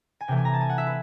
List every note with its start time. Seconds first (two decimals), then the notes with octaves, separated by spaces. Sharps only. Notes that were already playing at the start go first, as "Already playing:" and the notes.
0.21 G#5
0.28 C3 E3 A3 G5
0.37 G#5
0.45 A#5
0.54 A5
0.61 G#5
0.70 F#5
0.78 E5
0.87 B4